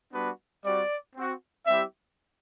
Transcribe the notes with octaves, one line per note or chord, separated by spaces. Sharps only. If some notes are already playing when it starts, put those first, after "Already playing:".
G3 B3 D4 F#4 B4
G3 C4 F#4 D5
C4 F#4
G3 C4 E4 G4 E5